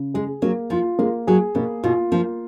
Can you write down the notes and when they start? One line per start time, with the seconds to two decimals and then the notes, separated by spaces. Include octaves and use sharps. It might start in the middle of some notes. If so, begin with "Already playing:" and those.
Already playing: C#3
0.14 G#3 G#4
0.42 F#3 A#3
0.70 F3 F4
0.99 G#3 A#3
1.27 F#3 G#4
1.55 B2 A#3
1.84 B2 F4
2.12 F3 A#3